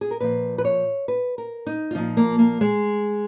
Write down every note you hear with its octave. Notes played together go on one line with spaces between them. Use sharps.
G#4
A#4
A#2 F3 B4
B4
C#5
B4
A#4
D#4
F4
A#2 F3 D#4
A#3
A#3
G#3